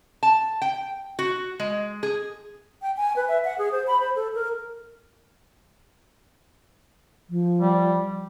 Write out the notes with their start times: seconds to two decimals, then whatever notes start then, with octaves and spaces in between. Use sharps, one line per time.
0.23 A5
0.62 G5
1.19 F#4
1.60 G#3
2.03 G#4
2.82 G5
2.97 G#5
3.16 B4
3.28 E5
3.44 F#5
3.58 G#4
3.72 C5
3.87 B5
4.00 C5
4.16 A4
4.35 A#4
7.30 F3
7.61 G3